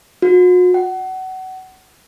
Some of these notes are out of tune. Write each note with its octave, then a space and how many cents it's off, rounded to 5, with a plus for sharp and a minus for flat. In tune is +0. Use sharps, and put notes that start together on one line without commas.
F#4 -40
F#5 +25